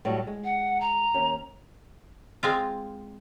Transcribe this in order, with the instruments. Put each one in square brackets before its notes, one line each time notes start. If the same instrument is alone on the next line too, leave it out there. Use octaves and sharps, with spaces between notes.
[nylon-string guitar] A2 F#3 G3
G#3
[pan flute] F#5
A#5
[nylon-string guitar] D#2 C#4
[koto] G#3 C4 F4